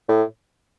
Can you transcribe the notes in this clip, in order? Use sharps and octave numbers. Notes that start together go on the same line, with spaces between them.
A2